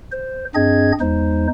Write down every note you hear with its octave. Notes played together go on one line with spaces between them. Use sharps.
C5
G2 C4 D4 G#4 D#5 G#6
E2 G#3 D#4 C5